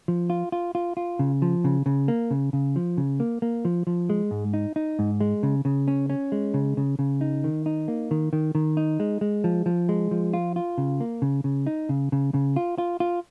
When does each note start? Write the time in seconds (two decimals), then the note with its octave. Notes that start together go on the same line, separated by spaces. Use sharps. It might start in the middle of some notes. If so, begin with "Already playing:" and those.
0.08 F3
0.30 F4
0.52 F4
0.75 F4
0.97 F4
1.19 C#3
1.42 F3
1.64 C#3
1.86 C#3
2.08 A#3
2.31 C#3
2.53 C#3
2.76 F3
2.98 C#3
3.20 A#3
3.42 A#3
3.65 F3
3.87 F3
4.10 G#3
4.31 G#2
4.54 D#4
4.76 D#4
4.99 G#2
5.20 G#3
5.43 C#3
5.65 C#3
5.88 C#4
6.10 C#4
6.32 G#3
6.54 C#3
6.77 C#3
6.99 C#3
7.21 D#4
7.44 D#3
7.66 D#4
7.88 A#3
8.11 D#3
8.33 D#3
8.55 D#3
8.77 D#4
9.00 G#3
9.21 G#3
9.44 F3
9.66 F3
9.89 G#3
10.11 F3
10.33 F4
10.56 F4
10.78 C#3
11.00 A#3
11.22 C#3
11.44 C#3
11.67 D#4
11.89 C#3
12.12 C#3
12.34 C#3
12.56 F4
12.78 F4
13.00 F4